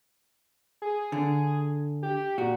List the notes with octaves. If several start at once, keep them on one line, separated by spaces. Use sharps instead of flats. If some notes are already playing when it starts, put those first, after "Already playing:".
G#4
D3
G4
A#2 F#4